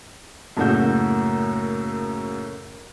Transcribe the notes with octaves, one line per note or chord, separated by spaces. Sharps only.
F#2 A2 C#3 A#3 F#4 G6